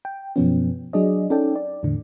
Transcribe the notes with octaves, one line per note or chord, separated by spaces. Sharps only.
G5
F#2 B2 F3 B3 C#4
F#3 D4 G#4 D5 D#5
C#4 D#4 A4 D5 G5
D5
E2 A2 D3